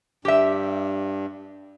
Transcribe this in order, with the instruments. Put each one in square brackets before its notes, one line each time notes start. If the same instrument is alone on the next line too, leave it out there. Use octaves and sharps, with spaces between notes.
[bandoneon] G2 [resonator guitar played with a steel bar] G4 E5